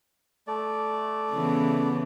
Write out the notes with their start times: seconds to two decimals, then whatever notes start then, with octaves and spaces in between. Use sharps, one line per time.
0.47 A3 D5
1.32 C#3 E3 B3